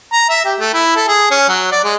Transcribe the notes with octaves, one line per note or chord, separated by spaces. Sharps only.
A#5
E5
G4
A3
E4
A4
G#4
C#4
F#3
D5
G#3